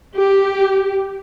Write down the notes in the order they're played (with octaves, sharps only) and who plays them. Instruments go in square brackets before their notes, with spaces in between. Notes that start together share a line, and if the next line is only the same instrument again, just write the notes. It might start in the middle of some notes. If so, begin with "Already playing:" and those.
[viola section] G4